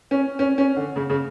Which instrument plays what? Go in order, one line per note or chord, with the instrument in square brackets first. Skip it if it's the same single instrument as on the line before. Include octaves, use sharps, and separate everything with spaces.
[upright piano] C#4
C#4
C#4
D3
C#3
C#3